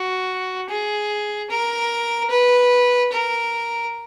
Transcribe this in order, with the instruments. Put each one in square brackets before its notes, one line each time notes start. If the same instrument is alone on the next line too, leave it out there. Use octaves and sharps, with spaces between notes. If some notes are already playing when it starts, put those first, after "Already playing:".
Already playing: [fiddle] F#4
G#4
A#4
B4
A#4